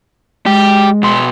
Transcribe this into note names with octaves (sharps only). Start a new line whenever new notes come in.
G#3 G4
B2 C6